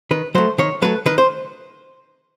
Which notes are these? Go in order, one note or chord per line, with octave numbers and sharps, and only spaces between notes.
D#3 B4
F#3 A3 C5
D#3 C#5
F#3 A3 B4
D#3 B4
C5